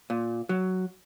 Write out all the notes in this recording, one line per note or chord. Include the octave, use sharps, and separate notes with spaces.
A#2
F#3